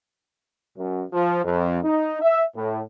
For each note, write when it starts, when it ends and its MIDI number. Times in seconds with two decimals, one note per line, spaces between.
0.77 1.02 42
1.12 1.40 53
1.44 1.78 41
1.83 2.19 63
2.22 2.43 76
2.55 2.80 45